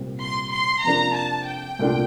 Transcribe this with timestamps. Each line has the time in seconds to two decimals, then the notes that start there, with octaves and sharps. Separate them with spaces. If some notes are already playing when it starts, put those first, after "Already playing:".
Already playing: C2 A#2 G3 C4
0.21 C6
0.52 C6
0.84 F2 C3 F3 A#3 D4 A#5
1.15 A5
1.47 G5
1.79 C2 A#2 A3 D4 F4